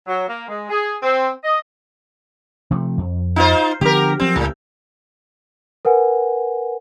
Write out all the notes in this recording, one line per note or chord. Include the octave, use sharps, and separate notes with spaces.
F#3
A#3
G#3
G#4
C4
D#5
C3 F3 A3
F2
D#4 F4 C5
D3 F3 B3 G4 A#4
F3 F#3 C4
C#2 A2
A#4 B4 F#5 G#5